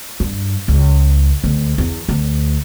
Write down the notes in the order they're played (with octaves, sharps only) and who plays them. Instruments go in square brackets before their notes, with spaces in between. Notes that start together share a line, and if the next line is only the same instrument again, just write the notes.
[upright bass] G2
C#2
D2
E2
D2